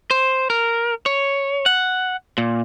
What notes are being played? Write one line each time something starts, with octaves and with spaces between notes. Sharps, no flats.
C5
A#4
C#5
F#5
A#2